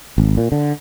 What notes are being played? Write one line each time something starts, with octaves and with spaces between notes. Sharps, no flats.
G#1
A#2
D3